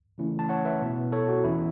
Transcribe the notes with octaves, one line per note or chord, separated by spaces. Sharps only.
C#3 E3 A3 C#4 E4
A5
C#5 F#5
B4 E5
B2 B3 E4
A4 C#5
F#4
E2 E3 C#4 E4